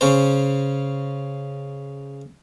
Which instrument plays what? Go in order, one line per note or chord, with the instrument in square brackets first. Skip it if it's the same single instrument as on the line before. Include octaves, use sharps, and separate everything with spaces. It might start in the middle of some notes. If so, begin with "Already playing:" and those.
[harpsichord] C#3 C#4 C5